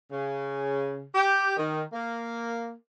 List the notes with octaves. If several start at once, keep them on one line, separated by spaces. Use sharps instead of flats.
C#3
G4
D#3
A#3